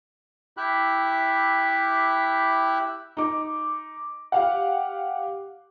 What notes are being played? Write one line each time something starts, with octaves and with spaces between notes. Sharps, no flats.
E4 G4 E5 B5 F#6
D#4 D6
G4 F5 F#5